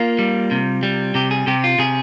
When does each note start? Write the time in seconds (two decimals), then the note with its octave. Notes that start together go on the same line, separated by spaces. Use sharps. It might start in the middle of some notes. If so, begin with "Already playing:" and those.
Already playing: A#3 F4
0.19 G3
0.51 C3
0.83 G3
1.15 C3 G4
1.31 G#4
1.47 C3 G4
1.64 F4
1.79 C3 G#4